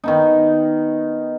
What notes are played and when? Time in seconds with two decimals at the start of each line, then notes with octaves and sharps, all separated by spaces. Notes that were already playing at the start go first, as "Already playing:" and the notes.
0.04 D#3 B3 D#4